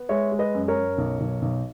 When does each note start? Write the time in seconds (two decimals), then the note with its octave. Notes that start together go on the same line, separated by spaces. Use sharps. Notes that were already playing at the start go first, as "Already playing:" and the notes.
Already playing: B3
0.09 G#3 C#5 E5
0.32 G#3
0.39 B4 D#5
0.55 F#2
0.68 A#4 C#5
0.76 F#2
0.98 B1
1.20 B1
1.42 B1